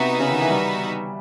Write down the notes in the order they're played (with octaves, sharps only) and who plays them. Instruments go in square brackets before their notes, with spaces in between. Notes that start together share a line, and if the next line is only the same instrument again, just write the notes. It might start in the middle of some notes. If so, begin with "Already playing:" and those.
Already playing: [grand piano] C3 [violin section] B3 D#4 F#4 B4 E5
[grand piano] C#3
D#3
E3
G3